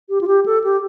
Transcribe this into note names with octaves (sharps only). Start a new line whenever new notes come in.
G4
F4
G4
A4
G4